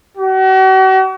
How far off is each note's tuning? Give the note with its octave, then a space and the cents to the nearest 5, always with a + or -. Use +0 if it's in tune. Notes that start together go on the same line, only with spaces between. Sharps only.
F#4 +40